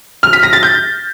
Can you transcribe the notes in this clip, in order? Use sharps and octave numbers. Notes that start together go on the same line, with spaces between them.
F6
B6
A#6
A6
G6